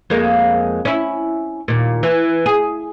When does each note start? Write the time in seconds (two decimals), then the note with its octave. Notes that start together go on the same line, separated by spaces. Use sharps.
0.10 F2 G#3 A#3
0.85 C#4 E4
1.68 D#2 A#2
2.03 E3
2.46 G#4